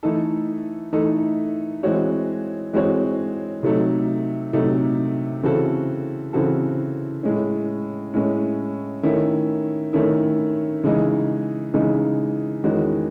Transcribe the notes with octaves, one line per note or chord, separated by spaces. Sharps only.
E3 A3 D#4 A4
E3 A3 D#4 A4
E3 G#3 C4 F#4 C#5
E3 G#3 C4 F#4 C#5
C3 F#3 A3 D#4
C3 F#3 A3 D#4
C#3 E3 C4 F#4 A4
C#3 E3 C4 F#4 A4
A2 G#3 C#4
A2 G#3 C#4
D#3 A3 C#4 E4
D#3 A3 C#4 E4
C#3 E3 G#3 D#4
C#3 E3 G#3 D#4
E2 D#3 G#3 C#4 F#4